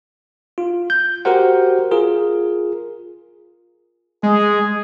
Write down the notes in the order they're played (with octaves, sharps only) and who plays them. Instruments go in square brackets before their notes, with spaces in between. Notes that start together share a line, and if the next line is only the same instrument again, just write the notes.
[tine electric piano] F4
G6
F#4 G4 A#4 C5 F#5
F4 G#4 A#4
[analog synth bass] G#3 [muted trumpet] G#4